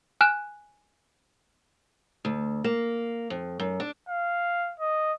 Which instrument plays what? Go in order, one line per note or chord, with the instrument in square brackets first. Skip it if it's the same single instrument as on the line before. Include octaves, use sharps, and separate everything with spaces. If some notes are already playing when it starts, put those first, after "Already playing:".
[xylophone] G#5 F6 F#6 E7
[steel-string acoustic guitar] D2
A#3
F2
F#2
D4
[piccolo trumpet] F5
D#5